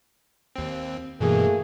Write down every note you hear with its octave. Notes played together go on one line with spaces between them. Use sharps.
D#2 C4
G2 B2 E3 A3 A#3 G#4